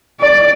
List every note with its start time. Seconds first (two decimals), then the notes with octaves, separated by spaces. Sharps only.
0.20 D5